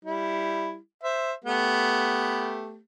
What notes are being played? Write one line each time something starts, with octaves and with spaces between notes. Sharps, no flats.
G3 E4
C5 E5
A3 B3 G4